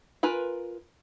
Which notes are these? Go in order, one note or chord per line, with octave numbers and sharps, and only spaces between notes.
F4 A#4 B4 G#5